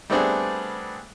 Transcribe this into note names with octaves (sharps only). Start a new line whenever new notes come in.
G3 A3 B3 C4 D4 G#4